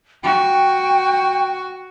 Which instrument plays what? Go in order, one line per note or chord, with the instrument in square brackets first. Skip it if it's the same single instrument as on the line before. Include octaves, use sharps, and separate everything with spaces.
[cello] F#4 [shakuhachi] G5